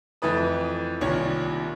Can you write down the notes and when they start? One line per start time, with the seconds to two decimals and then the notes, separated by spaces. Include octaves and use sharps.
0.22 F2 E3 A3 B4 D#6
1.01 C2 A#2 D#3 C#5